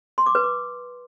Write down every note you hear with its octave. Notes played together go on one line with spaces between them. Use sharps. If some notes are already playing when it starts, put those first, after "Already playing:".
C6
D6
B4
D6